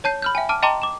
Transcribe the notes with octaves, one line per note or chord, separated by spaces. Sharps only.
C#5 A5 G6 C7
B5 F6 G6
E5 G5 G#5
A5 D6 F6 D7
D#5 G5 A5 A#5 C6 D6
D6 E7